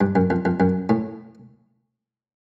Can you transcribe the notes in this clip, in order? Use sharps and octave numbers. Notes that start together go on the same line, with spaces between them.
G2
F#2
F2
F2
F#2
A2